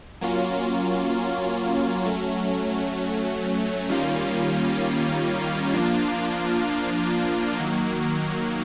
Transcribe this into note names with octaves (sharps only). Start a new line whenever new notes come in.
F#3 A#3 C#4 F4
F#3 A3 C#4
D#3 G3 A#3 C#4 F4
F3 A#3 D4 F4
D#3 F#3 A#3